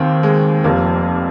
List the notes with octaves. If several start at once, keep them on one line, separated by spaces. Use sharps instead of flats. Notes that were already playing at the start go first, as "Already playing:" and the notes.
Already playing: D#2 D#3 A#3 C4
G#3
F1 F2 C3 F3 A#3